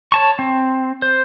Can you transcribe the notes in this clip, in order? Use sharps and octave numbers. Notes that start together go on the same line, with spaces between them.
C#5 A5 C#6
C4
C5